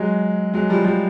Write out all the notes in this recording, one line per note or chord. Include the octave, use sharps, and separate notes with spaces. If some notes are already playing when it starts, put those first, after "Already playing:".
Already playing: F#3 G#3
F#3 G#3
F3 G3
F3 G3